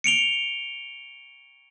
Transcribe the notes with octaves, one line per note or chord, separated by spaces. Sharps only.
C#7 D7 F7 G7